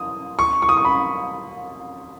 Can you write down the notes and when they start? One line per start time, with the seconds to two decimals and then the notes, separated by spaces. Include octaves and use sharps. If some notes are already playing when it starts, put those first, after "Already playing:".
Already playing: D#6
0.39 C#6
0.62 C#6
0.69 D#6
0.77 C#6
0.85 B5